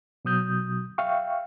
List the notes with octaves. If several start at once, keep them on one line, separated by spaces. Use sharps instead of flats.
B2 F#3 D#6 G6
E5 F5 G5 C#6